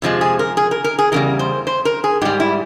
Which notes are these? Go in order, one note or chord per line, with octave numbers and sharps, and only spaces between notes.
F2 C3 F3 G#3
G#4
A#4
G#4
A#4
A#4
G#4
E2 C#3 G3 A#4
C5
C5
A#4
G#4
G#2 G3 G4
E4